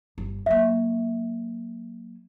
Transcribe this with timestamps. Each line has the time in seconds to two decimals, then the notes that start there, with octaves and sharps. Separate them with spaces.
0.18 G1
0.46 F#3 A#3 E5